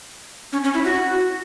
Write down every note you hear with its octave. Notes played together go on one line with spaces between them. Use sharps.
C#4
C#4
E4
F#4